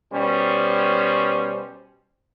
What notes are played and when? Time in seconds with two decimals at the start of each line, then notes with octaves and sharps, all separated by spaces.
0.12 B2 G3 C#4 C5